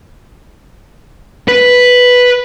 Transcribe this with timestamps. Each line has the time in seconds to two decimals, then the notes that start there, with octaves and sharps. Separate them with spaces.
1.48 B4